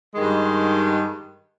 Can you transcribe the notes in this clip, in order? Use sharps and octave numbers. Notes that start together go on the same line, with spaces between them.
G2 D#3 G#3